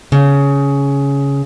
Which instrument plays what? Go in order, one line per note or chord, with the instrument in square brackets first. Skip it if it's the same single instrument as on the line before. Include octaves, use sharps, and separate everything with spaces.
[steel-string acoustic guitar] C#3